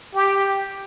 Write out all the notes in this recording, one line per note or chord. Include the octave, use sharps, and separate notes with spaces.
G4